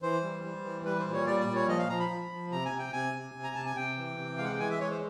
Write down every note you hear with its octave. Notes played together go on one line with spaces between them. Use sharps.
E3 C5
G3
G3
E3
G3 B4
C5
A#2
C#5
G3 D5
D5
A#2
C#5
F3 D#5
F5
F3 A#5
B5
F3
F3
C3 A#5
G#5
C3
G5
C3 G#5
C3
C3
A#5
C3 A5
G#5
C3 G5
E3
C3
G#3 F5
F#5
G5
E3 G#5
E5
G#3 C#5
C5